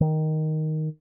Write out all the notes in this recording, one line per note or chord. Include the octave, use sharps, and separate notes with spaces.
D#3